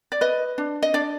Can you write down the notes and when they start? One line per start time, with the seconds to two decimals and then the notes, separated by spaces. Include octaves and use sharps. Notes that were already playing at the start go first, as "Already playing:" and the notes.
0.12 D5
0.21 B4 D#5
0.58 D4
0.83 D#5
0.94 D4 D5